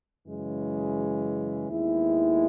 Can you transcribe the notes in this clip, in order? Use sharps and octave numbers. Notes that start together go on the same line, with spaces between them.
F#2 C#3 E3 G#3
D#2 D#3 G#3 B3 E4